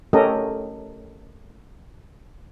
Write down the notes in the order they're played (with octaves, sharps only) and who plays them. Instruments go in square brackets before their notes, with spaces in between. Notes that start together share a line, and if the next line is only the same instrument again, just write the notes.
[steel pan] A3 C#4 G4 A4 A#4 D#5